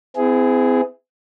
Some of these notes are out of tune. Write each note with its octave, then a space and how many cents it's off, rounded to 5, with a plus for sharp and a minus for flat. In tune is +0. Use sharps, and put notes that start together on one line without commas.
C4 -40 E4 +0 G#4 +0